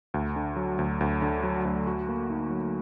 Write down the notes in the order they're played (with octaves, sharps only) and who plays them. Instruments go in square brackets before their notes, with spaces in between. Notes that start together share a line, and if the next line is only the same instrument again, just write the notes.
[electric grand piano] D2
D3
F#3
D2
D2
D3
F#3
D2
F#4
A#3
D#4
F#3